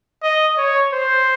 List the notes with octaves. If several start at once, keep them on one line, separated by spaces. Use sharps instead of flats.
D#5
C#5
C5